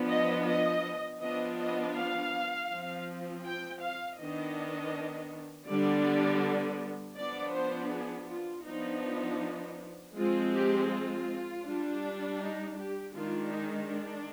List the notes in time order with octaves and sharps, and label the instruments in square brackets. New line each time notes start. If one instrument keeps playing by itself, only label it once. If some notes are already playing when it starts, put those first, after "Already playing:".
Already playing: [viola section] F3 B3 D4
D#5
D#5
F3 B3 D4 D#5
D#5
F5
F3 C4
G5
F5
D#3 B3 D4 D#5
D3 G3 B3 D4 D5
F3 B3 D4 D5
C5
G#4
F4
F3 B3 D4 D#4
F3 G#3 C4 F4
G4
F4
G3 D4
D#4
G4
D#3 G#3 D4 F4
D#4
D4